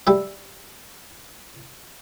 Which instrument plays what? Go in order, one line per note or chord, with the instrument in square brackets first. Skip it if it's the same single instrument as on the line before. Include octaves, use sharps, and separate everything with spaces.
[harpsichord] G3 E5